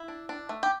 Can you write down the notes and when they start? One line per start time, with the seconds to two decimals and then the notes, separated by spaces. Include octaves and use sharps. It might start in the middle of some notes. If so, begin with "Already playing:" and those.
Already playing: E4
0.08 D4
0.29 D4
0.49 A3
0.63 G4